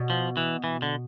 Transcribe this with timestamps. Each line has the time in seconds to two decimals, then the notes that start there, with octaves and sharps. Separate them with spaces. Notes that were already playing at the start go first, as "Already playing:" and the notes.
Already playing: B2
0.10 F3
0.37 E3
0.64 E3
0.82 D3